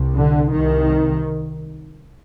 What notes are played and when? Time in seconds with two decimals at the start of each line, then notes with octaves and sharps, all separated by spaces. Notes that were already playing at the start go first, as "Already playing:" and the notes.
Already playing: C2 C3
0.16 D3
0.52 C2 C3 D#3